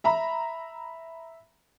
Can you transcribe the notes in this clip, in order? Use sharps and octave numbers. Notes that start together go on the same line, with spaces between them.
E5 A#5 B5